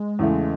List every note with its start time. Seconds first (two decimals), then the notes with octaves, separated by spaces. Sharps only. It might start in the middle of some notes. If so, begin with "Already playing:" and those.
Already playing: G#3
0.19 E2 C#3 E3 A3